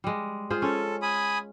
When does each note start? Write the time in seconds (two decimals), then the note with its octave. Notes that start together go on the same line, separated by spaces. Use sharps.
0.04 G3 G#3
0.50 F4 G#4 C5
0.62 C#4 A4
1.02 G#5 B5 D#6